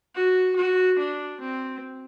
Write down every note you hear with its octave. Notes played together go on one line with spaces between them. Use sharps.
F#4
F#4
D4
C4